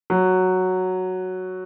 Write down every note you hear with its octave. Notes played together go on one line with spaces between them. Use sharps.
F#3